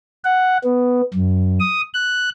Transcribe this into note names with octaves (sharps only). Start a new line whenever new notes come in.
F#5
B3
F#2
D#6
F#6